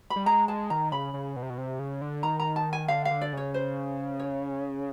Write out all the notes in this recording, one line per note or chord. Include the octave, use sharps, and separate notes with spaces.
B5
G3
G#3 A#5
G#3 A5
D#3 A#5
C#3 B5
C#3
B2
C3
B2
C3
C#3
D3
D#3 A#5
A#5
A5
G#5
D3 F5
F5
D3
D5
C#3 C#5
C5
C#5